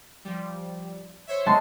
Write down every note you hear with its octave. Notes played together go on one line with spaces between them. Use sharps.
F3 G3
C5 C#5 E5
G#3 A5 C6